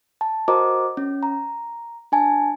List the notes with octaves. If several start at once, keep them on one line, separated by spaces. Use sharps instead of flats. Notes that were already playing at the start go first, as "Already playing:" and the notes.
A5
F#4 A#4 C5 D#5 A#5 D6
C#4
A#5
D4 G#5 A5